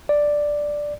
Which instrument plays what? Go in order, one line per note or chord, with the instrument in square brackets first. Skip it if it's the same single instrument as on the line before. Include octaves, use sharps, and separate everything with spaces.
[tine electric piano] D5